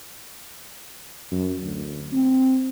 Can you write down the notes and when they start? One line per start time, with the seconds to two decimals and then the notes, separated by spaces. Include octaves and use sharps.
1.32 F#2
1.63 D2
2.13 C4